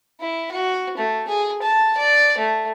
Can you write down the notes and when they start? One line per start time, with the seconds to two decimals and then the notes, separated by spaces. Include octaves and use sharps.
0.20 E4
0.52 F#4
0.97 A3
1.28 G#4
1.62 A5
1.97 D5
2.38 A3